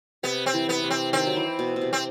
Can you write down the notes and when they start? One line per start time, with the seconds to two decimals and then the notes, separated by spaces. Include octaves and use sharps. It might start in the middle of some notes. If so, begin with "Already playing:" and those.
0.23 C3 B3
0.46 C4
0.53 E3
0.69 B3
0.84 C3
0.90 C4
1.13 D#3 C4
1.27 F#3
1.36 E3
1.59 B2
1.76 B2
1.81 C3
1.93 C4